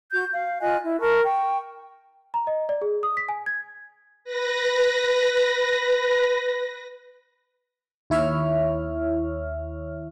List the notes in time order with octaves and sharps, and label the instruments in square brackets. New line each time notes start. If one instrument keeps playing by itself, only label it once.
[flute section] F#4 G6
F5
F4 D#5 G#5 F#6
E4
A#4 A5 A#5 C#6
G5 C#6
[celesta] A#5
D#5
D5
G#4
D#6
B6
G#5
G#6
[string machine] B4 A#6
[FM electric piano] D#2 E4 C#5 E5 F6